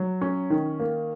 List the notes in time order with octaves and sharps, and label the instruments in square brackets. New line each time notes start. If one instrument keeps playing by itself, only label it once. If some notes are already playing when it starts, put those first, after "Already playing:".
Already playing: [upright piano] F#3
C#4
D#3
A#3